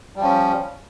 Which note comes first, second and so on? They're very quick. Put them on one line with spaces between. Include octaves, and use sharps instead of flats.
G3 F3 C#4